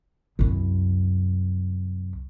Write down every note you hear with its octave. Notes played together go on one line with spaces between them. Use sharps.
C2 F#2